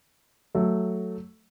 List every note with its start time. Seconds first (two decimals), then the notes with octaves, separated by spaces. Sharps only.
0.55 F#3 A3